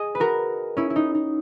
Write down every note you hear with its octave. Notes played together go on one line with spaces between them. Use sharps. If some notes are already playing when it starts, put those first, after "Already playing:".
Already playing: G#4 D#5
B4
F#4 A#4
C#4 E4
E4
D#4
D#4